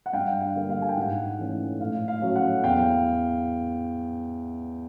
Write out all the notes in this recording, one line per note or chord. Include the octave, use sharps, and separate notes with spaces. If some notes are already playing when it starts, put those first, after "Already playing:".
F#5
G2 F5 G5
F5
D3 G3 A#3 D4
F5
G#5
G5
G#2 F#5
E3 A3 C#4
A2 F5
F5
F#3 A3 C#4
F#5
E2 F5 G5